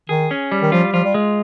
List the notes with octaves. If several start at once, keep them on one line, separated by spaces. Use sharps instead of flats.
D#3 G#4
C#4
G3
D#3
F3 F4
F3 F4
G3
G#3